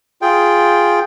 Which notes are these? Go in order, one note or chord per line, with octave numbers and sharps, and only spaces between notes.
F4 G#4 G5